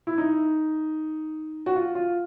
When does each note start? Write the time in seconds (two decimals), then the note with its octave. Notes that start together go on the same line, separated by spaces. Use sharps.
0.07 E4
0.18 D#4
1.66 F#4
1.75 F4
1.95 F4